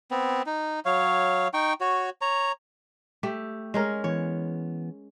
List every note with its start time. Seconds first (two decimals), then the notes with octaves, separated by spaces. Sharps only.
0.11 B3 C4
0.46 D#4
0.85 F#3 C#5 F5
1.54 D#4 G5 C#6
1.81 F#4 C#5
2.21 C#5 A#5
3.23 A3 G4
3.74 G#3 C#4 A#4
4.04 E3 B3 C#5